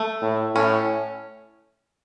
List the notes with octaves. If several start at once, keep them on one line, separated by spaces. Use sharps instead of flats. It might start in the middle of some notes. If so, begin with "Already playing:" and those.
Already playing: A3
A2
A2 C#4